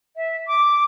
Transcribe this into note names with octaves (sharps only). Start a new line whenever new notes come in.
E5
D6